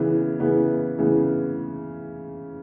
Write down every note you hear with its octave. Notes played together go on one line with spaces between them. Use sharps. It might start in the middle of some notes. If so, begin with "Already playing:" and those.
Already playing: C#3 E3 B3
C#3 E3 B3
C#3 E3 B3